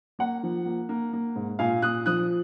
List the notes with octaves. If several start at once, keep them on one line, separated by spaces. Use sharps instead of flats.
A#3 F#5
F3
A#3
A#3
A#3
G#2
A#2 F5 G#5
A#2 D#6 F#6
F3 D#6 F#6